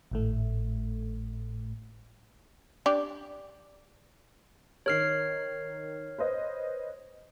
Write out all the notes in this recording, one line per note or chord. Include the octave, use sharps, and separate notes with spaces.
G#1 A2 A3
D4 G4 D5
D#3 A#4 C#5 F6 C7
B4 C5 D#5